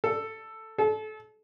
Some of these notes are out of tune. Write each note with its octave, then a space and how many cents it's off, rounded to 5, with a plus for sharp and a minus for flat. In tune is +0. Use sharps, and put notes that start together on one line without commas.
A4 +5
A4 -30